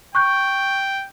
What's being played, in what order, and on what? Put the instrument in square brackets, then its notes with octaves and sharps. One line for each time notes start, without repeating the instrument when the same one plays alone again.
[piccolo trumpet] G5 [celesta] C#6 F#6 G6